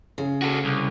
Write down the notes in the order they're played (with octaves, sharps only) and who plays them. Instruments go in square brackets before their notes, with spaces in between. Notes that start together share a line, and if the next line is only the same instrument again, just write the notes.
[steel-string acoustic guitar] C#3
[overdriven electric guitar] F#4 A4
C2